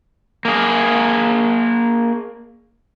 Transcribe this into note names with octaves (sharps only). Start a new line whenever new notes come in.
A#3 G#4